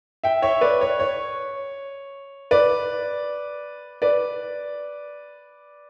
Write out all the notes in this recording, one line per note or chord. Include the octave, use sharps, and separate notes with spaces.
E5 G5
C#5 E5
B4 D5
C#5
C#5
B4 D5
B4 D5